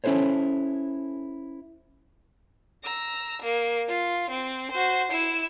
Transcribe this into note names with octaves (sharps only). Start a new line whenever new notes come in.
C#4 E4 A4 C5 C#5
A#5 E6
A#3
F4
C4
F#4 C5
E4 E7